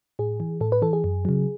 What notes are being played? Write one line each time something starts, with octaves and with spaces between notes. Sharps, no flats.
A2 G#4
E3
A2 A4
B4
E3 A4
G#4
F#2
C#3 F#3